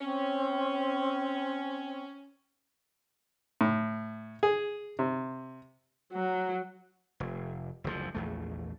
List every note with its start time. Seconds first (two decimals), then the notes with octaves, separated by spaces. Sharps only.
0.01 C4 C#4
3.61 A2
4.43 G#4
4.99 C3
6.12 F#3
7.20 F1
7.84 F#1 D2 A2 F3
8.15 A#1 E2 A3